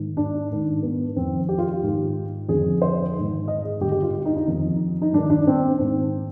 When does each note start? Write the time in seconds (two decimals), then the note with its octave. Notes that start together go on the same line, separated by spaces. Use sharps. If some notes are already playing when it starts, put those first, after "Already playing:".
Already playing: G#2 D#3
0.17 D4
0.51 G#2 D#3
0.83 B3
1.16 F2 D#3 C4
1.49 G4
1.58 F4
1.68 G4
1.82 G#2 D#3
2.49 F2 D3 G#4
2.82 C5
3.15 G#2 D#3
3.48 D#5
3.65 G#4
3.81 G2 G4
3.84 D3
3.92 G4
4.03 F4
4.14 F4
4.26 D#4
4.36 D#4
4.48 F2 D#3
5.02 D#4
5.13 G2 D#3 D4
5.30 D4
5.47 C4
5.79 G#2 D#3 C4